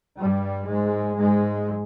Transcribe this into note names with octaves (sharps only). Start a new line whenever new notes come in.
G2 G3
G#2 G#3
G#2 G#3